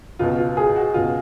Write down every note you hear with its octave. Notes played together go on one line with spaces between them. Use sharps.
C#2 B2 F4
F4
G#4
F#4
C#2 B2 F4